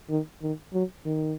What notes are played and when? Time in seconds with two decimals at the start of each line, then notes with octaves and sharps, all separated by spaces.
0.09 D#3
0.42 D#3
0.73 F#3
1.05 D#3